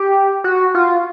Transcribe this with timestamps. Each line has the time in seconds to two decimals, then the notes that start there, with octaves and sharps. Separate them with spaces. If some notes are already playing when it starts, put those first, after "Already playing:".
Already playing: G4
0.44 F#4
0.75 F4